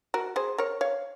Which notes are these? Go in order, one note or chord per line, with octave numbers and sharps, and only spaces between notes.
F#4 A#4
G#4 C5
A#4 C#5
C#5 F5